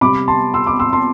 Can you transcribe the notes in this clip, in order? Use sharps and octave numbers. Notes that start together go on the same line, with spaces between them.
C3 G3 B5 D6
A5 C6
C6 E6
B5 D6
C6 E6
A5 C6